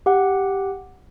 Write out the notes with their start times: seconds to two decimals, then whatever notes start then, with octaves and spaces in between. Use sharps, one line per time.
0.06 G4 F#5